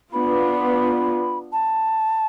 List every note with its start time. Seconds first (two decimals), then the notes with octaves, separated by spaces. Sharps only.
0.13 B3 D4 F4 B5
1.52 A5